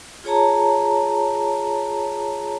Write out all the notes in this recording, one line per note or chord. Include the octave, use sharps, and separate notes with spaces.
F4 G#4 C#5 A5 A#5